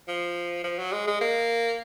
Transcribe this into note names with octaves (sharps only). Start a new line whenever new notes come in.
F3
F3
F#3
G#3
G#3
A#3